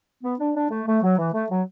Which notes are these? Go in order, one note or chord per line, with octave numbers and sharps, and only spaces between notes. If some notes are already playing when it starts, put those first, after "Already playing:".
B3
D4
D4
A3
A3
F#3
E3
A3
F#3